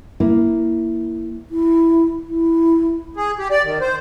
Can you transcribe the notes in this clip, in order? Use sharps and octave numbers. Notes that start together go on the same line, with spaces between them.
A#3 E4
E4
E4
G#4
G4
D5
D#3
C5